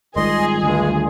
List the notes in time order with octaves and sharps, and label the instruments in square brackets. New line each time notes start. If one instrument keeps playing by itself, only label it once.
[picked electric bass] G#1 G#2 [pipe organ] D#3 G3 F4 [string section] G#4 [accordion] D#5 C6
[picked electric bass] D2 [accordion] G2 G#3